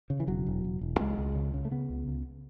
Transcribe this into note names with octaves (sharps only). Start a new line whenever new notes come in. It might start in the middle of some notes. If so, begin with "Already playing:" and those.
C#3
E3
E1 F#3
E1
E1
E1
C#2 G#3
C#2
C#3
C#3
A3
C#3 B3
C#2
C#2